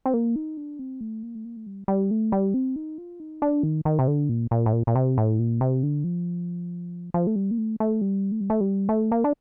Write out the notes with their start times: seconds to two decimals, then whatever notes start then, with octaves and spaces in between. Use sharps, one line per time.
0.06 C4
0.14 A#3
0.36 D#4
0.57 D4
0.79 C4
1.01 A3
1.23 A#3
1.35 A3
1.45 A#3
1.57 A3
1.66 G3
1.88 G3
2.11 A3
2.32 G3
2.54 C4
2.76 D#4
2.98 F4
3.20 D#4
3.42 D4
3.63 D#3
3.85 D#3
3.99 C3
4.08 D3
4.29 A#2
4.51 A#2
4.66 A2
4.73 A#2
4.87 A#2
4.95 C3
5.18 A2
5.39 A#2
5.61 C3
5.83 D3
6.04 F3
7.14 F3
7.27 A3
7.36 G3
7.51 A#3
7.58 A3
7.80 A3
8.01 G3
8.32 A3
8.41 G3
8.50 A3
8.61 G3
8.89 A3
9.12 A#3
9.24 D4